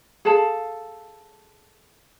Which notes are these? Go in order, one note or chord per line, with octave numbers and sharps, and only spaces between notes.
G#4 A4 F5 A5